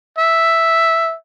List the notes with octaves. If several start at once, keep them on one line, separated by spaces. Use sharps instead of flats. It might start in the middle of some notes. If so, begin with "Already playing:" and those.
E5